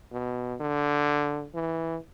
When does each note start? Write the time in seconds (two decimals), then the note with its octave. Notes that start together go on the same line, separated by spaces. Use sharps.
0.12 B2
0.60 D3
1.54 E3